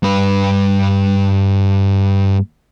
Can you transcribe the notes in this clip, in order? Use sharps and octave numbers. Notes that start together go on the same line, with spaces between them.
G2 B4